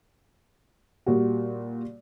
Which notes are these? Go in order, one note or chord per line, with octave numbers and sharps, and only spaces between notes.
A#2 G3 F#4